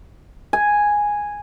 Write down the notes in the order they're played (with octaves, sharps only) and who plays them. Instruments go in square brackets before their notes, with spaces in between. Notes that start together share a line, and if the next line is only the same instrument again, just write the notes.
[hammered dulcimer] G#5